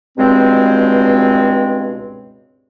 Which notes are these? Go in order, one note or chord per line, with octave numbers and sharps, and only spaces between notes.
C#2 G2 B2 G#3 C4